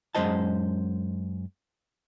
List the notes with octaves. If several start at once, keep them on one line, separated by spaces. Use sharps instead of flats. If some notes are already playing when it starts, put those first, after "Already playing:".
F#2 E3 G#3 C5 D#5 A5